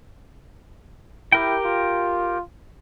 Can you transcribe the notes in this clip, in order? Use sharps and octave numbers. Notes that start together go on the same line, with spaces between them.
E4 G4 A#4 G5
F4